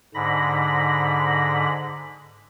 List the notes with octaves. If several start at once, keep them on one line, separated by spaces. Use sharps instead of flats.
G#2 D3 B5 A#6